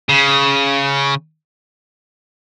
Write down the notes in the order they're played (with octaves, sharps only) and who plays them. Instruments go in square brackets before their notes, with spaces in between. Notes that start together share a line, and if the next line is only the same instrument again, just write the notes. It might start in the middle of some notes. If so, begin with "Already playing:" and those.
[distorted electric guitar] C#3